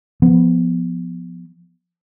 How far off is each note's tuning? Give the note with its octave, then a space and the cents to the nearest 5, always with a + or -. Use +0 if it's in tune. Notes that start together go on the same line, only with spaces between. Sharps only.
F3 +0 B3 +0